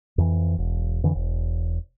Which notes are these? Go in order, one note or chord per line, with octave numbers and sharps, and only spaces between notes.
F2 E3
E1
F2 D3 E3
E1